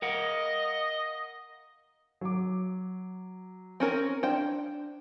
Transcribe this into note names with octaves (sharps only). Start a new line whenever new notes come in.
A#4 D#5 F5 F#5
F#3 D6
C4 C#4 A#4
D4 C5 G5